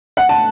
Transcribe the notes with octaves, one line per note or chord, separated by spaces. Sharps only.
F#5
A5